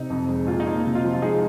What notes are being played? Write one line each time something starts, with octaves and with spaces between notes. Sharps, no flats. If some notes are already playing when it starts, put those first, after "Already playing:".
Already playing: C3 D#4
F2
G#3
A#2 F4
D#4
A#3
C3
F4
F3
F4
G#3 D#4 G#4